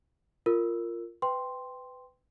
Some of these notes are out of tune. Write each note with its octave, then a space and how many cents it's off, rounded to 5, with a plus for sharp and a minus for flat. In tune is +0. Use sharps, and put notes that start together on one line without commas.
F4 -10 A#4 -15 E6 +0
B4 +25 G5 +0 C6 +0